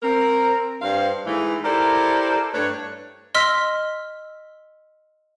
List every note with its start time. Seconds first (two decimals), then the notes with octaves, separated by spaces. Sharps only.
0.03 C4 A#4
0.81 G2 C5 F5
1.26 G#2 E3 A3
1.64 E4 G4 A4 A#4 C5 D5
2.54 G2 A3 D4 B4 C#5
3.34 D#5 C6 E6 F6 B6